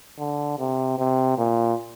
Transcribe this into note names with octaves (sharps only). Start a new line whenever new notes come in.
D3
C3
C3
A#2